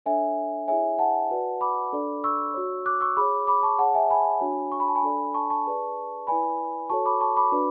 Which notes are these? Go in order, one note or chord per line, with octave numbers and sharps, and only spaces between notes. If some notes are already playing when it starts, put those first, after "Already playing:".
D4 A4 C#5 E5 G#5
E4 G#4 C#5 E5 G#5
F#5 A5
F#4 B4 D5
B5 D6
D4 A4 D5
C#6 E6
F#4 C#5
D6 F#6
C#6 E6
G#4 C#5 B5 D6
B5 D6
A5 C#6
G#4 C#5 F#5 A5
E5 G#5
G#5 B5
D4 F#4 C#5
C#6
B5
A5
G#5 B5
D4 A4 D5
A5 C#6
A5 C#6
G#4 B4 D5
E4 B4 D5 G#5 B5
F#4 A4 C#5 A5 C#6
B5 D6
A5 C#6
B5 D6
D4 F#4 B4 D5